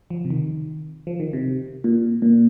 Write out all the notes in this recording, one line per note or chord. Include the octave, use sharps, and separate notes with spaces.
F3
C3
D#3
F3
D#3
C3
A#2
A#2